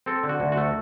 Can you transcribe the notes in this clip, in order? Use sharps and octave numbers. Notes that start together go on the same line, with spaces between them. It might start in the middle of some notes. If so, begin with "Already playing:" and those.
C4 A4
D3
F#4
D2
F#4
A3